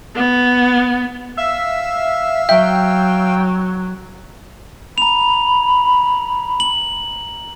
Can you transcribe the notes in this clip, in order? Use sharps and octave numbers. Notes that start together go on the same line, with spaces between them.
B3
E5 F5 E6
F#3 E5 G5
A#5 B5 F7
F#7